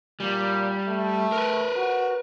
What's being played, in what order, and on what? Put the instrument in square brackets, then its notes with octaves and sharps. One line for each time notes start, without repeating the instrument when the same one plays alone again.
[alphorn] A#2 [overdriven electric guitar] G3
[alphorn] A3
[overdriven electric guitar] A#4 B4
[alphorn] F#4